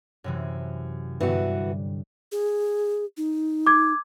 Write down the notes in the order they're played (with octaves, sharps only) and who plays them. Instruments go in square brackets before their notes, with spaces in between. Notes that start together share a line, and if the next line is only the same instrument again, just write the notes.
[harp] F#2 C3 E3
[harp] G2 D3 [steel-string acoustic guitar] E3 B3 F#4
[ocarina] G#4
D#4
[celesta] D6 G#6